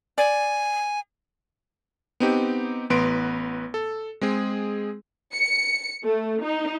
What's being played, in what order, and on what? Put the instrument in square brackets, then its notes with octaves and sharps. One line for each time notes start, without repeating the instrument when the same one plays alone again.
[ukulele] D5 [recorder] G#5
[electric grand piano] B3 C4 D#4 G4
A1 B3 B4 C6 D7
A4
G#3 C4 G#4
[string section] C#7
A3
D#4